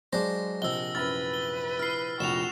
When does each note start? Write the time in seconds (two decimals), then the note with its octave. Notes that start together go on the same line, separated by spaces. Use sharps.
0.13 F#3 G#3 D4 C5 A#6
0.62 A#1 C3 D#5 E6 G7
0.95 F#2 E4 B4 F6 A6
1.34 G7
1.79 E4 F6 C7
2.20 F1 A#1 E4 F#4 E7 F7